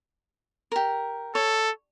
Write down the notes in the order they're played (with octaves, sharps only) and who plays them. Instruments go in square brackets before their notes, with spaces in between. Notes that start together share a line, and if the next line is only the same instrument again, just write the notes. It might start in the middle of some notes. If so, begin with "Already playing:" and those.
[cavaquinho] G4 A#4
[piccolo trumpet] A4 [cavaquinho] C#5